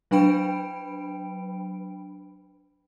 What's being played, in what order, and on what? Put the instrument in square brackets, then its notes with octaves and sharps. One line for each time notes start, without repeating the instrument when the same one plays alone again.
[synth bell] F#3 D4 B4 G5 B5 D7